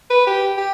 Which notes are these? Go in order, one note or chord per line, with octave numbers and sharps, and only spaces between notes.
B4
G4
G4